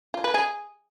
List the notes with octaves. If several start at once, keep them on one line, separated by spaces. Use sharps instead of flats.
F4
B4
G#4